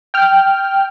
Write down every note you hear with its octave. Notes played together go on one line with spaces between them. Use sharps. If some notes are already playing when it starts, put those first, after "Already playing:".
G5 F6